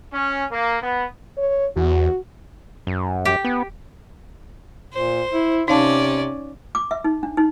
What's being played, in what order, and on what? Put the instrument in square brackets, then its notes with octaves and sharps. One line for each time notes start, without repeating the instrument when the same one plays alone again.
[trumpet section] C#4
A#3
B3
[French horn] C#5
[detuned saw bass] E2 [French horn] F#4
[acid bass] F#2
[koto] G4
[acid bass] B3
[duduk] A#2 [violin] C5
[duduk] E4
[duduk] C3 [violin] C#4 D5 [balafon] D#4 F5 A5
[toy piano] D6
E5
D#4
D4
D#4